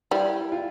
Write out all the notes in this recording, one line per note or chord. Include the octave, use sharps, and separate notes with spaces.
G3 E4
F4